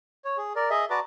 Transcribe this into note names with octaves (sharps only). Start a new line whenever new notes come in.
C#5
G#4
A#4 D5
G#4 D#5 E5
F#4 B4 D5 A5 A#5 D6